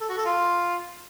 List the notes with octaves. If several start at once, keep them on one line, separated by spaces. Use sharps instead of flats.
A4
F#4
A4
F4